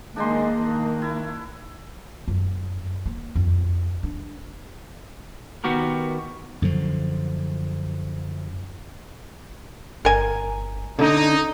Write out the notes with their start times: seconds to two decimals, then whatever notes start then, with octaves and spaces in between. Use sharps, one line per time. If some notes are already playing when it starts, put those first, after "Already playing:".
0.16 D#3 G#3 A#3 D4 D#4 C6
0.55 D#3
1.02 E4
2.28 F#2
3.06 A#3
3.36 F2
4.03 D4
5.64 D#3 B3 F#4 G4 A#4
6.62 F#2 D3 F3
10.05 G1 A#4 G#5
10.99 D3 C#4 D#4